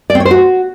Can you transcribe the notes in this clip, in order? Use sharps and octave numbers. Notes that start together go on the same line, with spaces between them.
D5
C4
C#5
C5
F#4